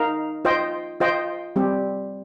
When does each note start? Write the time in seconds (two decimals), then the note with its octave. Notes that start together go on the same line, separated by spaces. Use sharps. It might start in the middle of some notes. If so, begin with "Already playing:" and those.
Already playing: D#4 A#4 F5
0.45 F4 C5 D#5 G5
1.00 F4 C5 D#5 G5
1.56 G3 C4 G4